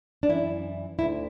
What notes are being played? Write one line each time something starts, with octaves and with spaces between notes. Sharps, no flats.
D4
F#2 E3 E4
D2 D3 E4